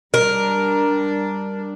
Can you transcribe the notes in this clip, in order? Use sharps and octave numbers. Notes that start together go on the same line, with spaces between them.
G3 D4 A#4